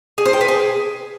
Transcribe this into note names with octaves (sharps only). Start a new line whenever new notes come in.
G#4
C5
G5
B4
G#4